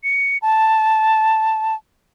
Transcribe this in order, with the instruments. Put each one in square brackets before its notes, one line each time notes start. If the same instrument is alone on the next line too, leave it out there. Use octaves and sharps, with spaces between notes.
[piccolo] C#7
A5